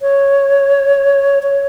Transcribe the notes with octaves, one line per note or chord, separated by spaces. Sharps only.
C#5
C#5